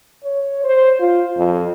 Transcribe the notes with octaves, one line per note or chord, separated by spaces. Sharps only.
C#5
C5
F4
F2